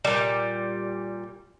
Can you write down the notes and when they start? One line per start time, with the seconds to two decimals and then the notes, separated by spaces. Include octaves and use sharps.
0.05 A#2 G3